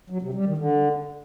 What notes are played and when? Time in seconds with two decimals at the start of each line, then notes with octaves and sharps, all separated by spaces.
0.10 F#3
0.22 C3
0.34 G3
0.46 D#3
0.57 D3